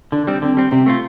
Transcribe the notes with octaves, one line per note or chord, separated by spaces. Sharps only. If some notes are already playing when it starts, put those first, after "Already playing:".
D3 D4
G3 C4
D3 C4
G3 C4
C3 C4
A3 C4 F4